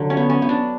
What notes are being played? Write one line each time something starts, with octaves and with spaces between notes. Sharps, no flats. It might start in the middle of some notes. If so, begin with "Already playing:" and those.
Already playing: D3 F#3
C#4
B3
C#4
B3
D4